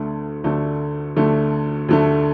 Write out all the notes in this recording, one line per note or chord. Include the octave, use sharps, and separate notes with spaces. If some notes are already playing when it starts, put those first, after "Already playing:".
Already playing: D2 D3 A3
D2 D3 A3
D2 D3 A3
D2 D3 A3